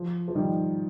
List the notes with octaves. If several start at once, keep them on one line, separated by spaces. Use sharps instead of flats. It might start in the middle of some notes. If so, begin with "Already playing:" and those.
Already playing: F3
F3
D#3 G3